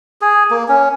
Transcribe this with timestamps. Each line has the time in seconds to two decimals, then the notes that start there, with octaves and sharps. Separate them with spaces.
0.21 G#4
0.50 A#3
0.68 C#4